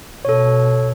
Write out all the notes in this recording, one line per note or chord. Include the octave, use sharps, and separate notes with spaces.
B2 A4 C#5